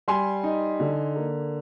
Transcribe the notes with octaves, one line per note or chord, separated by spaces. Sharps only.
G3 G#5 C6
D#4
D3
A#3